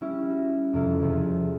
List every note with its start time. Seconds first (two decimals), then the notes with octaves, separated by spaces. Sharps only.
0.01 G3 C#4 E4
0.30 F#4
0.73 F2 C3 E4
1.02 E2 C3 F3